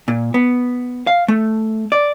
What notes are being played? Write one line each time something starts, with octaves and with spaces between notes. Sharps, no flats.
A#2
B3
F5
A3
D5